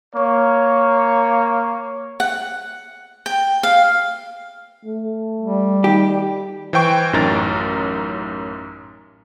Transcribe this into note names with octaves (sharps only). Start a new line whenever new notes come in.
A#3 C#5
F#5
G5
F5
A3
G3
D#3 G4
E3 C5 G5 C#6
A1 F#2 D#4 A#4 A#5 A6